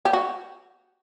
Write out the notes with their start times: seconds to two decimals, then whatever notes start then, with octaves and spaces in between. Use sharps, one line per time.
0.05 G4
0.13 F#4